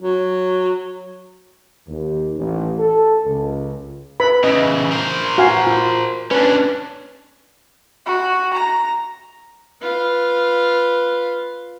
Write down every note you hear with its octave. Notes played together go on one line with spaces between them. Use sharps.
F#3
D#2
A1
A4
C#2
B4 B5
C#3 E3 D#5
A#4 C5
F#4 F5 G#5
F4
C#4 D4 B4
F#4
A#5
F4 B4